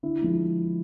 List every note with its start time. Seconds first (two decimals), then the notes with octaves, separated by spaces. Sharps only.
0.03 D3 E4
0.22 F3 G#3